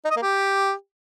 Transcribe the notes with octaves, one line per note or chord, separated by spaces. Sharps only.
D#4
D#5
A#3
G4